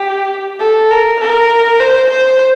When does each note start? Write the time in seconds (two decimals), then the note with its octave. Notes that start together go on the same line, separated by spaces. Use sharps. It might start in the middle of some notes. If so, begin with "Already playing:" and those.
Already playing: G4
0.60 A4
0.91 A#4
1.20 A#4
1.80 C5
2.10 C5